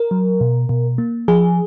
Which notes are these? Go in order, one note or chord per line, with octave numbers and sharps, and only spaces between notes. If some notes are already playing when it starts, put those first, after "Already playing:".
Already playing: A#4
F#3
B2
B2
A#3
F3 G#4